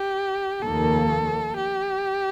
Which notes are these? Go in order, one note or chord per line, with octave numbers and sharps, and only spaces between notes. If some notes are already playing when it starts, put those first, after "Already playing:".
Already playing: G4
F1 D#2 D#3 A#3 A4
G4